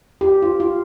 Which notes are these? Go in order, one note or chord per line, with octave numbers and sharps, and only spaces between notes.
G4
F4
F4